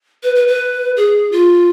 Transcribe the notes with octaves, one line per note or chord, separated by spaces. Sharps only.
B4
B4
B4
G#4
F4